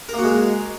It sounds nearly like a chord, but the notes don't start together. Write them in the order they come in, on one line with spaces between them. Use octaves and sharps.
A#4 A#3 F#4 G#3